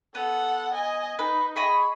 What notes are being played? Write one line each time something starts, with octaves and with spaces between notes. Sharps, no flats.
B3 A4 F#5
D#5 G#5
D#4 B4
G#4 D#5 B5 C#6